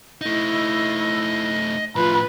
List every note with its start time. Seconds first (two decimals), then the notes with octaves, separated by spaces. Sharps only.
0.21 A3 D#4 E4 D#5
1.96 A2 F3 F4 B4